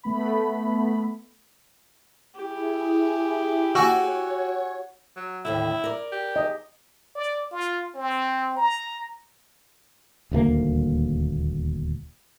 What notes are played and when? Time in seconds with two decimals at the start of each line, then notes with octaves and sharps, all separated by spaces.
0.04 A3 B3 B5
2.35 E4 G4 G#4
3.75 F#4 C#5 F#5 G#5 E6
5.16 F#3
5.45 D#2 A2 D3 E4
5.84 A#4 D5
6.12 G4
6.36 D#5
7.16 D5
7.52 F4
7.95 C4
8.57 A#5
10.31 D#1 D2 A3 A#3